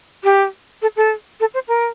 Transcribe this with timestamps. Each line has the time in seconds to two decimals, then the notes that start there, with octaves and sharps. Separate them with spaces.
0.24 G4
0.82 A4
0.96 A4
1.40 A4
1.54 C5
1.68 A#4